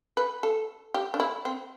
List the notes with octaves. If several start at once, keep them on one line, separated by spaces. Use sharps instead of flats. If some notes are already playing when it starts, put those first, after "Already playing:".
B4
A4
G4
D4
E4
C4